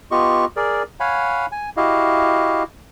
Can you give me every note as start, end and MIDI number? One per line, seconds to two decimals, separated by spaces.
0.11 0.45 59
0.11 0.45 65
0.11 0.45 67
0.11 0.45 75
0.11 0.45 85
0.56 0.83 68
0.56 0.83 70
0.56 0.83 74
1.00 1.46 73
1.00 1.46 77
1.00 1.46 78
1.00 1.46 80
1.00 1.46 83
1.52 1.70 80
1.77 2.63 64
1.77 2.63 66
1.77 2.63 67
1.77 2.63 75
1.77 2.63 77